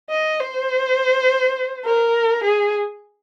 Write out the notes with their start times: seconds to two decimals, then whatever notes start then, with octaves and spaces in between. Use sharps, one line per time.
0.10 D#5
0.40 C5
1.85 A#4
2.44 G#4